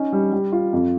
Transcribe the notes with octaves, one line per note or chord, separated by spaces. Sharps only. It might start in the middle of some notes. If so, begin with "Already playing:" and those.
Already playing: C#4 D#4
G3
G3
F4
F2